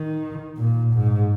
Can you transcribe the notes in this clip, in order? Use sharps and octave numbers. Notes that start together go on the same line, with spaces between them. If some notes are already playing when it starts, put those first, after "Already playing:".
Already playing: D#3
A#2
G#2